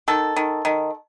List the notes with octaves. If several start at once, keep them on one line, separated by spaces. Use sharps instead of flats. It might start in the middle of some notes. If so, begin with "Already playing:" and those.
D#3 A4
D#3
D#3